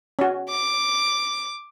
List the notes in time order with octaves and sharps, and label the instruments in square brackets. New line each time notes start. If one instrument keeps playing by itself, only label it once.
[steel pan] C#4 F#4
[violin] D6